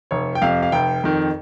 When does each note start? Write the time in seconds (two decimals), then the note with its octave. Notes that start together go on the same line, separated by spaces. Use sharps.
0.11 F1 C#5
0.35 G5
0.42 F2 C3 F5
0.63 F5
0.72 F1 G5
1.04 F2 D#3